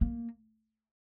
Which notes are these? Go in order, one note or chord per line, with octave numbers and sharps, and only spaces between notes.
A#3